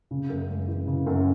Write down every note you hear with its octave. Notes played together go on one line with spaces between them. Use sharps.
C#3
F#2
G#3
E3
C#3
F#2